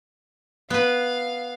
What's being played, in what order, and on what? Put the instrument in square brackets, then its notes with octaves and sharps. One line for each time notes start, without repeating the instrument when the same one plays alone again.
[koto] B3 B4 [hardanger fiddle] F5